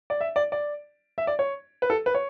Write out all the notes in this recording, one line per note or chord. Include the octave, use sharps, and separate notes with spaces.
D5
E5
D5
D5
E5
D5
C#5
B4
A4
B4
C#5